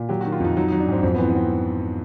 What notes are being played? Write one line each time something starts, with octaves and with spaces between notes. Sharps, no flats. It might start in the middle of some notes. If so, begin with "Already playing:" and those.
Already playing: A#2
F#3 G4
D#3 F#4
F4
F2 D#4
F#3 D#4
F#3 D#4
D4
G#2 C4
F2 C4
B3
E3 C4
B3
E3 C4